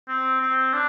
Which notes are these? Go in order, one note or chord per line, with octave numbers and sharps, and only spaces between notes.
C4
C4
D4